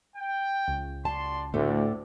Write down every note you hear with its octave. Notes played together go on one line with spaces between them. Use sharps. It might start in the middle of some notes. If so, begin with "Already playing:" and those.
G5
C#2
F#4 D5 A5 C6
D2 A2 A3 D5